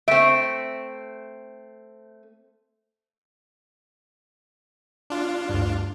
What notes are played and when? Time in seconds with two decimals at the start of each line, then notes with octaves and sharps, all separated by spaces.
0.08 A3 C4 E5 D7
5.10 D4 F4
5.49 D2 G2